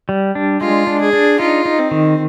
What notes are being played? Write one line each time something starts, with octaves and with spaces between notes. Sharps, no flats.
G3
D4
G#3 F4
D4
G#4
D4
D#4 F4
D#4
C4
D#3